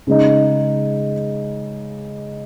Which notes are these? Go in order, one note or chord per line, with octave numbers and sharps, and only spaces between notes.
C#3 G#3 D#4